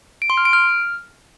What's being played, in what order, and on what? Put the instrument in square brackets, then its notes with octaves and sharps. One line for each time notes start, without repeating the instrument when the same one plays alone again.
[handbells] D7
C6
F6
D7
F6